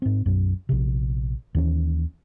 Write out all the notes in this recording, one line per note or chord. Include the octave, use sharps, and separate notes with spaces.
G#2 C4
B1 F#2
A#1 C3
D#2 E3 C#4